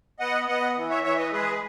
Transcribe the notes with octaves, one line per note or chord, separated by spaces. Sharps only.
B3 D#5 F#5
B3 D#5 F#5
E3
C#5 E5
E3 C#5 E5
B4 D#5
G#3 G#4 B4